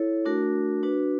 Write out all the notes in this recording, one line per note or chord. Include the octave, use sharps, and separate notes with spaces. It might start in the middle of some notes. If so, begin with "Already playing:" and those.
Already playing: E4 A4 C#5
A3 D4 F#4 A#4
D4 F#4 B4